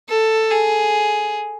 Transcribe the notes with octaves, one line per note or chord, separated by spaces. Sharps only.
A4
G#4